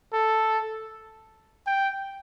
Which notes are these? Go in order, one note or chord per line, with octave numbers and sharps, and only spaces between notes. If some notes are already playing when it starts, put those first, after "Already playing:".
A4
G5